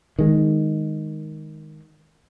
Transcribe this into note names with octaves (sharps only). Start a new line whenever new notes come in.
D#3 G#3